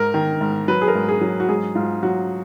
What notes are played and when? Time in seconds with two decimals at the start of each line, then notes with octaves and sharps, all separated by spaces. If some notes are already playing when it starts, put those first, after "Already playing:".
Already playing: G#2 A#4
0.14 D#3
0.41 G#2
0.68 F#3 B4
0.82 G#4
0.88 A#4
0.95 G#2
1.08 G#4
1.21 F#3
1.40 F#4
1.49 G#2 G#4
1.75 G#2 F4
2.03 F#3 F#4